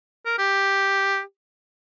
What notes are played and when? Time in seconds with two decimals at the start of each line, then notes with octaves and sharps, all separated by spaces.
0.25 A#4
0.38 G4